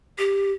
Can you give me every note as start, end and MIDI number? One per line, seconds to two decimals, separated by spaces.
0.18 0.52 67